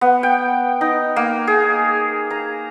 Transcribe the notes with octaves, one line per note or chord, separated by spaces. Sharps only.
B3
G5
D#4
A#3
G#4
A#5